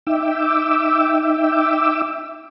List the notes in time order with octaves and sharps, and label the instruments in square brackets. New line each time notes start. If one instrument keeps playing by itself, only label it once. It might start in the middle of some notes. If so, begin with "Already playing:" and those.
[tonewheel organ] D#4 E5 G5 D6 E6